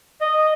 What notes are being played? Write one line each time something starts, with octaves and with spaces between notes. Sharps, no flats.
D#5